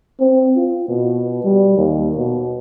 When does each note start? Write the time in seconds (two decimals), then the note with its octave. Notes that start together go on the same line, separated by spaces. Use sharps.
0.20 C4
0.56 F4
0.88 B2
1.44 G3
1.77 D#2
2.17 B2